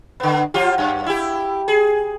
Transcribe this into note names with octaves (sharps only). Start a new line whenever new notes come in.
D3 B3
F3 F4 G4
F#2
E4 G4
G#4